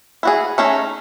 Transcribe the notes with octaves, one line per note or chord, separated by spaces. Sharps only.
E4 F#4 G#4
A3 C#4 D#4 G#4